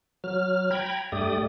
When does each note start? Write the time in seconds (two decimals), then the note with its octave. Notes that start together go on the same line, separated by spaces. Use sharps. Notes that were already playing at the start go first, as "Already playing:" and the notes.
0.24 F#3 F6
0.71 G5 A#5 B5 G#6
1.12 G2 A3 G4 D5 D#6